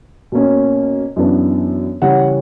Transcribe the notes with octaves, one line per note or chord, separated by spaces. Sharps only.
B2 A#3 C#4
F#2 E3 B3 D4
C#3 E3 G3 C#4 F#5